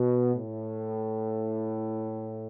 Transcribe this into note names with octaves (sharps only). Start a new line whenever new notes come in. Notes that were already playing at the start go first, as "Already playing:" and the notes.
Already playing: B2
A2